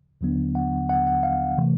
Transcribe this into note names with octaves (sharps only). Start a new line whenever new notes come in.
D#2 D3 F#3 B3 D4
F#5
F#5
F#5
F5
C3 E3 A3